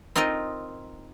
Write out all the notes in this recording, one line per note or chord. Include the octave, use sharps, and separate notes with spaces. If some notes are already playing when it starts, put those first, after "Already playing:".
C4 D#4 F4 A#4 D#5